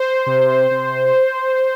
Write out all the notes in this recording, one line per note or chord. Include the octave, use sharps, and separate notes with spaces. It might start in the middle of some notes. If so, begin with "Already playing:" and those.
Already playing: C5
C3
C3